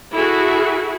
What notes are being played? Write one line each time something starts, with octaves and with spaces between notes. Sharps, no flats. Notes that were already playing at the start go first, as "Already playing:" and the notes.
E4 F#4 G#4 A4